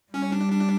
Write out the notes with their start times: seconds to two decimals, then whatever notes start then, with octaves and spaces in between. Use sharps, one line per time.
0.13 G3 C#4
0.32 D4
0.52 D4